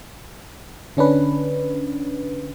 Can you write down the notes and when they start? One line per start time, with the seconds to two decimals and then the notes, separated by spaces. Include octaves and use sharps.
0.97 D3 C#4 D4 B4